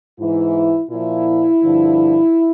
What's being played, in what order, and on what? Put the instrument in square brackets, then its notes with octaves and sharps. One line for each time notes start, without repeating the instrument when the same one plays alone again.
[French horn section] G#2 E3 E4
A#2 F3 E4
G2 D3 F3